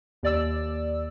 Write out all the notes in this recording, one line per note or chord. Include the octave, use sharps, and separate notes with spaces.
D#2 D5 E6